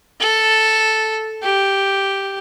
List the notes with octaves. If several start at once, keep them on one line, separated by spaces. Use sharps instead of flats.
A4
G4